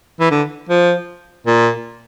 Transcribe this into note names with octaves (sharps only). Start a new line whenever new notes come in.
E3
D3
F3
A#2